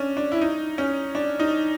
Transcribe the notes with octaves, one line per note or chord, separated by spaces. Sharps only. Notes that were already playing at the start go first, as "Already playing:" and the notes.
Already playing: C#4 D4
D4
E4
D#4
C#4
D4
D#4